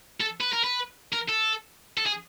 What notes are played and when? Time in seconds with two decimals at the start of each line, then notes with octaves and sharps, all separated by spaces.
0.21 A4
0.41 B4
0.53 A#4
0.64 B4
1.13 A#4
1.29 A4
1.98 A4
2.06 G#4